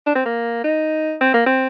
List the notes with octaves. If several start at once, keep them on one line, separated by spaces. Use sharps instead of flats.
D4
C4
A#3
D#4
C4
A#3
C4